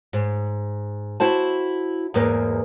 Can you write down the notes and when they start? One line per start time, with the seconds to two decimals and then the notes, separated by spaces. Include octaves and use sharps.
0.13 G#2
1.20 E4 F#4 C5 A5
2.14 E2 G#2 A#3 B4